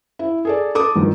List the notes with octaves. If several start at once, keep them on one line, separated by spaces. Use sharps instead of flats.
E4
G#4 A4 D5
A4 D6 D#6
G1 D#3 F3